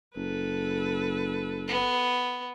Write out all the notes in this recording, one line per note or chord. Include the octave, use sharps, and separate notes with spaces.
F#1 A4 B4
B3